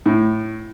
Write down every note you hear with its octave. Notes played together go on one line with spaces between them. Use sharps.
A2